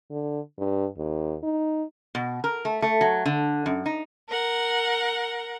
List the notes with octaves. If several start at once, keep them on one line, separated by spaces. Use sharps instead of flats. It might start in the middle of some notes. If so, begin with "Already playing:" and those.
D3
G2
D#2
D#4
B2
A#4
A3
A3
F#3
D3
F#2
D#4
A#4 F#5